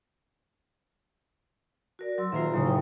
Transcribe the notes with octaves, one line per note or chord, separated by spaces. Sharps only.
F#4 A#4 D5
F#3 C6 E6
D#1 F4 E5 A#5 C7
A2 C#3 F#3 D#6
F#1 G5